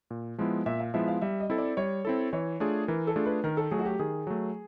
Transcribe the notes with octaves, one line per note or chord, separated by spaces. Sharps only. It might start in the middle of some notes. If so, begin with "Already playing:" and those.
A#2
F3 G#3 B3 E4
A#2 E5
F5
F3 G#3 B3 E4 E5
F5
G3 E5
D#5
C4 E4 A4
D5
G3 C#5
C4 E4 A4
E3 C#5
A3 D4 F4 G#4
E3 A#4
A4
A3 D4 F4 G#4
B4
D#3 A#4
A4
F#3 A3 G#4
F#4
G4
D#3 G#4
F#3 A3